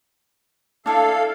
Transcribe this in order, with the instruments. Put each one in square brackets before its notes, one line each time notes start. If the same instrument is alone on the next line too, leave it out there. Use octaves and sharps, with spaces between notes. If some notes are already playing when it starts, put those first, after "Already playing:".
[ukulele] D4 E4 [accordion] A4 F5